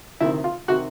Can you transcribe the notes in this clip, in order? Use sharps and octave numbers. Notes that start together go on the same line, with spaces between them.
D2 C3 D#3 E4
F4
C3 D#3 F#4